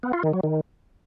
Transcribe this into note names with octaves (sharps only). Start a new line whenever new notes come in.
B3
F4
D#3
F#3
D#3